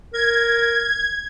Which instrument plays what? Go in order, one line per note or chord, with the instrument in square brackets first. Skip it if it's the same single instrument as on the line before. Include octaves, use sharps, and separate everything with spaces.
[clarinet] A#4 [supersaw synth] G#6